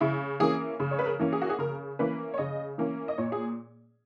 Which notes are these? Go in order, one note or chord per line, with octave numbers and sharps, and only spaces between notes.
C#3 E4
E3 A#3 C#4 G#4
C#3
C#5
B4
A#4
E3 A#3 C#4
G#4
F#4
G#4
C#3 A#4
E3 A#3 C#4 B4
C#5
C#3 D#5
E3 A#3 C#4
D#5
A#2 C#5
G#4